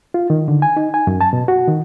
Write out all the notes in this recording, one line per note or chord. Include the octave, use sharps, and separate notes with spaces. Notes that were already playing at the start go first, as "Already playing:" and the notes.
F4
D#3
D3
G#5
D#4
G#5
F#2
A5
B2
F#4
D#3